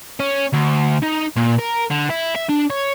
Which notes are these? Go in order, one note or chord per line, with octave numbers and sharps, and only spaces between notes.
C#4
D2
D#4
A#2
A#4
D3
E4
E5
D4
C#5